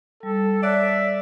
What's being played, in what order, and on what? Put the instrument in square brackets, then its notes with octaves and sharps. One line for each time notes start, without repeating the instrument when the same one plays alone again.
[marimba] G3 [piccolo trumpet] A4
[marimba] C#5 F#6 [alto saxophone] D5 [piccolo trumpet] E5